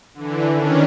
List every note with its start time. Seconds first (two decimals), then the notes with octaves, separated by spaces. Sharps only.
0.14 D3 E3
0.55 D#3 C#4 D4